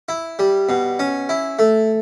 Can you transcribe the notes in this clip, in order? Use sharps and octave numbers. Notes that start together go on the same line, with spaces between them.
E4
G3
B2
C#4
E4
A3